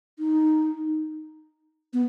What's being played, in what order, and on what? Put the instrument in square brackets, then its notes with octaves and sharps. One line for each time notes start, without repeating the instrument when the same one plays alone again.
[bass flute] D#4
B3